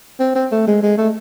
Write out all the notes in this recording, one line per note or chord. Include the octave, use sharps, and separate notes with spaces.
C4
C4
A3
G#3
G#3
A3